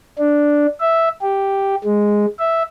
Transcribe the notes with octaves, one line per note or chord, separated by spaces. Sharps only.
D4
E5
G4
G#3
E5